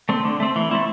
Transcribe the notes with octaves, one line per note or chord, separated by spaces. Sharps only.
A3 C4
D3
A3 C4
E3
A3 C4 E4